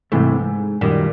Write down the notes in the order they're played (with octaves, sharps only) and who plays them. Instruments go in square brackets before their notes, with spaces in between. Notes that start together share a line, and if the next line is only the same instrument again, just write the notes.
[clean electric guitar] C2 C3 E3 A3 [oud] G#2
[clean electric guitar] F#2 D#3 G3 [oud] A#2